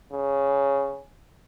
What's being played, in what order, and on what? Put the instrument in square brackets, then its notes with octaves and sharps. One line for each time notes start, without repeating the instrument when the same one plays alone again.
[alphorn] C#3